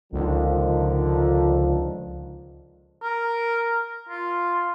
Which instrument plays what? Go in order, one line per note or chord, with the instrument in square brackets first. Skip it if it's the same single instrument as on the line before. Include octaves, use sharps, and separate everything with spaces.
[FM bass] C#2 [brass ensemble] D3 D#3 F3
[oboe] A#4
F4